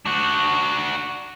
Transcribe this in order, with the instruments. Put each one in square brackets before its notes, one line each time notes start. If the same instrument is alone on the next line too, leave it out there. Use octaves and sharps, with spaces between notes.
[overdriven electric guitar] D4 F#4